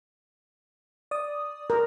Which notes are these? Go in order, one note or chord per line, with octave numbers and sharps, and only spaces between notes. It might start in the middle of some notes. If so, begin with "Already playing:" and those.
D5 D#6
A#4